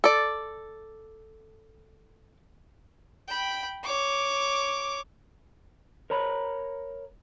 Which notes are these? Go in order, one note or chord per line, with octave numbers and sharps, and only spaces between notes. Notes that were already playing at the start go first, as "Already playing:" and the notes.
A4 D5
G5 B5
C#5 D6
A#4 C#5 A#5 B5